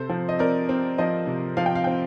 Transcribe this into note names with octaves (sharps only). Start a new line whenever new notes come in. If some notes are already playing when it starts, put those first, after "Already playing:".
Already playing: C3 A4 C5
F3
D#5
C4 A#4 D5
C4
F3 C5 D#5
C3
F3 F5
G5
F5
C4 G5